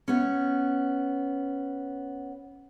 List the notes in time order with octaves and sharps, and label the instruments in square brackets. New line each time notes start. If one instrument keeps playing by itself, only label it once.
[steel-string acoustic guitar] B3 C#4